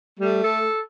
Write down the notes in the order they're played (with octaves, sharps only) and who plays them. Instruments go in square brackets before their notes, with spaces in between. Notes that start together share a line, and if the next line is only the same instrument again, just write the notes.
[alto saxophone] G3 [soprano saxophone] A3
[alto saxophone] A4